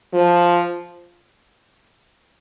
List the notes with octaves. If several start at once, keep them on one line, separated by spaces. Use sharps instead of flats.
F3